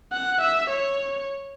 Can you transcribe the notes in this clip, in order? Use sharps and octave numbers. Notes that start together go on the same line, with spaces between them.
F#5
E5
C#5